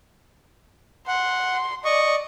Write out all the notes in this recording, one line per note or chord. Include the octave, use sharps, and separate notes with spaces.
F#5 C6
D5 D#5 C#6